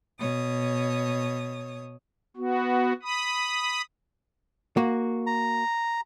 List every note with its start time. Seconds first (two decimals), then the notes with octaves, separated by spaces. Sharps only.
0.19 B2 C#5 D#6
2.37 B3 F#4
3.02 B5 D#6
4.77 A#3 F#4
5.27 A#5